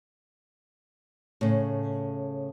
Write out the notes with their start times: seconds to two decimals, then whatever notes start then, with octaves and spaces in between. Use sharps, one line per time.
1.41 A2 C#3